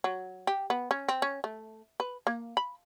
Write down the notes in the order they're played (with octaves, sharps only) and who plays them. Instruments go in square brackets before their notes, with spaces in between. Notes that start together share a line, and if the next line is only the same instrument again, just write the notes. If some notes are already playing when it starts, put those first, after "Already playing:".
[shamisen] F#3
G4
B3
C#4
C4
C#4
A3
B4
A#3
B5